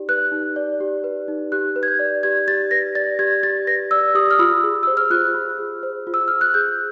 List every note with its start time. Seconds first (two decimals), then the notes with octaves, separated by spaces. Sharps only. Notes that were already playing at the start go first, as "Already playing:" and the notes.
Already playing: D#4 G4 D5
0.09 B4 F#6
0.32 D#4
0.56 D5
0.81 G4
1.04 B4
1.28 D#4
1.52 G4 F#6
1.76 B4
1.83 G#6
1.88 G6
1.99 D5
2.23 G4 G#6
2.48 G4 A6
2.71 B4 A#6
2.95 D5 A6
3.19 G4 G#6
3.43 G4 A6
3.67 B4 A#6
3.91 D5 E6
4.15 G4 D#6
4.31 F6
4.39 F4 E6
4.64 G#4
4.83 C5 E6
4.97 F6
5.10 F4 F#6
5.34 F4
5.59 G#4
5.83 C5
6.07 F4
6.14 E6
6.28 F4 F6
6.41 F#6
6.54 G#4 G6